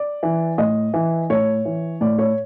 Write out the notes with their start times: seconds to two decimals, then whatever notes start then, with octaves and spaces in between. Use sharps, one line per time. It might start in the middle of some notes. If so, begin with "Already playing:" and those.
Already playing: D5
0.23 E3
0.58 A2 D#5
0.94 E3
1.30 A2 C#5
1.65 E3
2.01 A2 D5
2.19 C#5